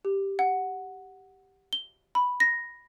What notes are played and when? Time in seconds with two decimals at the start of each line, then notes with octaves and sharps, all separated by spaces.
0.05 G4
0.39 F#5
1.73 G7
2.15 B5
2.40 A#6